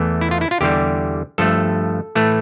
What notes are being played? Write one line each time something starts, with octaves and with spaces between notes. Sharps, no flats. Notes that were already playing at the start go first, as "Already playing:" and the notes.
Already playing: E2 E3 A3
E4
F4
E4
F4
E2 D3 G3 G4
G2 F3 A3 A4
A2 E3 A3